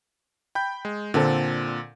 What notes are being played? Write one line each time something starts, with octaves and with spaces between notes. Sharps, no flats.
G5 B5 G6
G#3
A#2 D3 C4 A4